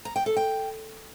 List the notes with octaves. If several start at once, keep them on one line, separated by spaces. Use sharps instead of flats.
A#5
G5
A4
G5